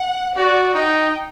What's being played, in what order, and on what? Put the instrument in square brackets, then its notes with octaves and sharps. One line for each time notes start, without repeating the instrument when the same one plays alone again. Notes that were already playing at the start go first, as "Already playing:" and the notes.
Already playing: [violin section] F#5
[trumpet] F#4 [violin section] D5
[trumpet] D#4 [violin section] G5